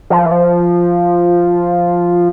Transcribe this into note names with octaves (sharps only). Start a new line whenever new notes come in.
F3
E3
F3